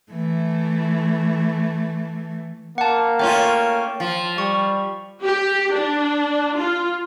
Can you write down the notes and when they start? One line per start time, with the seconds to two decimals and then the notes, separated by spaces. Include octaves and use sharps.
0.12 E3 A3
2.78 A#3 F#5 A5
3.19 A3 C#4 F4 G5
4.00 F3
4.38 G3 C#6
5.25 G4
5.73 D4
6.59 F4